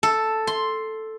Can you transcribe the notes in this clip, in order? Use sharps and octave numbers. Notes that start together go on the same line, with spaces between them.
A4
C6